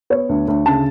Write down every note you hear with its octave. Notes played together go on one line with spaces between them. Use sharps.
B3 C#5
D2
D2
C#3 A5